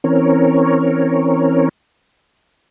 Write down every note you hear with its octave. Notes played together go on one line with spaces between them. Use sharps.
E3 C4 C#4 A#4 C#5